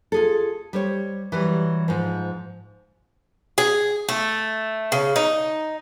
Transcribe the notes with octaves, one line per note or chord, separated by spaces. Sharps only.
F4 G#4 A4
G3 C5 C#5
E3 F#3 G3
G#2 F3
G#4
A3
C#3
D#4